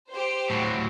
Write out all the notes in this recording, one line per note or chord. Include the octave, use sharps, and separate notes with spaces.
G4 C5
A2 F#3